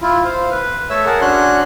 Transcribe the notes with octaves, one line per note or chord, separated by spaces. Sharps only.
E4 F4
C5 F5
B4
A3 A4 C#5 E5 E6
G#4 A#4 F#5 A5
C#4 D4 F#4 C#5 C6 F#6